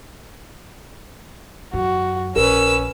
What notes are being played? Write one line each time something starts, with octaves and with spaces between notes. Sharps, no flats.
F#2 F#4
A#1 C#4 A#4 B4 E6